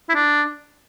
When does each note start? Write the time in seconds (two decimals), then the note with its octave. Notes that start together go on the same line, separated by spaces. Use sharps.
0.09 E4
0.15 D4